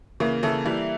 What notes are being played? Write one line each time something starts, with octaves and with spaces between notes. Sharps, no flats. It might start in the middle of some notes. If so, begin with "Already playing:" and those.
C#3 E3 A#3
C#3 E3 A4
E3 G3 E4